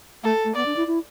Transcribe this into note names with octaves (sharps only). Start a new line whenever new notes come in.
A3 A4
A3
B3 D5
D4
E4
E4